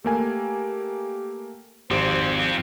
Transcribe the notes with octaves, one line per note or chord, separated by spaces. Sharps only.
A3 A#3 G4 G#5
G#1 F3 C4 G4 C5